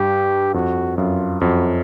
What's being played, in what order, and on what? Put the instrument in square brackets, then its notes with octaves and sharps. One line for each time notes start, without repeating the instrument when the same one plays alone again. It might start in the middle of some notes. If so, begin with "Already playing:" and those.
Already playing: [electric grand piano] G2 [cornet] G4
[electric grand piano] F2 [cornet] F#4
[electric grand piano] F#2 [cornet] F4
[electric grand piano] F2 [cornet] F#4